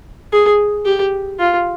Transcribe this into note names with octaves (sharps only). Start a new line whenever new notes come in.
G#4
G4
F4